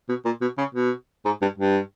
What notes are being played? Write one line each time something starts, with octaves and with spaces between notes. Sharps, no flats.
B2
A#2
B2
C#3
B2
G#2
G2
G2